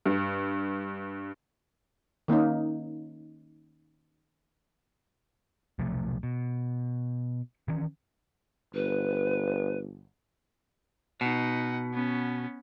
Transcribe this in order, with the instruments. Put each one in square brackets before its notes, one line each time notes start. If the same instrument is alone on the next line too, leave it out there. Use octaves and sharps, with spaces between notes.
[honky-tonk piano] G2
[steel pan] D#3 A#3 C#4 D#4
[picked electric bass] B1 C3 F3 A3
B2
D#3 E3 C#4
[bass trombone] G1 [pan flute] B4
[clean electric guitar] B2 [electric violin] D#4 F#5
[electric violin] B3 C#4